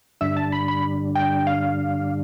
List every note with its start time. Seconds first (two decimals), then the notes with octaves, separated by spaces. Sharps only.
0.21 G2 D3 G3 D4 E5
0.37 A5
0.52 B5
0.68 B5
1.15 G5
1.47 F5